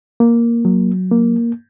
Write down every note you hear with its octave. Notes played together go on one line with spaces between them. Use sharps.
A#3
F#3
A#3